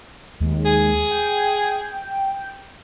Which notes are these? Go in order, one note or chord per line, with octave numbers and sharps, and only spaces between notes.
D#2 G#3
G#4
G5